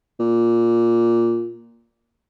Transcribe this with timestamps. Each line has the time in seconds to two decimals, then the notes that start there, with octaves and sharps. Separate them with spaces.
0.20 A#2